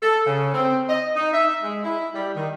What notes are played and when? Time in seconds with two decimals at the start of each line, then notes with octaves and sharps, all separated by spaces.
0.03 A4
0.26 C#3
0.54 C4
0.89 D#5
1.15 D#4
1.34 E5
1.63 G#3
1.84 E4
2.14 G3
2.36 D#3